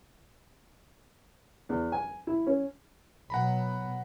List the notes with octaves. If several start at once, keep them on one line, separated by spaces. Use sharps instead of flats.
E2
G#5
E4
C#4
B2 F#3 B3 F#5 A#5 B5